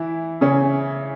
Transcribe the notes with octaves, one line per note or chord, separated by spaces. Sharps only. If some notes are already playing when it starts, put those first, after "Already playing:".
Already playing: E3 E4
C#3 C#4